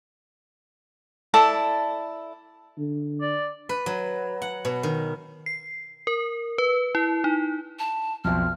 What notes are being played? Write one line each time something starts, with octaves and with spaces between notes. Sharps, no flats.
E4 A4 D5 A5
D3
D5
B4
F#3
F#5
B2
D#3
C7
A#4
B4
E4
D#4
A5
B1 F2 F6